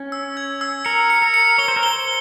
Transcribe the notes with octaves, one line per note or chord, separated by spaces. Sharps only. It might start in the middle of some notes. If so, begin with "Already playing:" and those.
Already playing: C#4
E6
G#6
E6
A#4 C#7
C#7
A#4
C#7
C#5 G7
C5
A#4
C5 G7